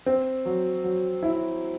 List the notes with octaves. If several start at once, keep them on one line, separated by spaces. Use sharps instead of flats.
C4
F#3
F#3
E4